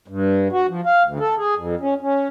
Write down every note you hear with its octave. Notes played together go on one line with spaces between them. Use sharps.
G2
F#4
F3
F5
D2
A4
G#4
F2
C#4
C#4